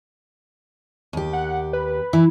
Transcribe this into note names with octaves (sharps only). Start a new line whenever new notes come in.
D#2 G4
F#5
B4
E3 E4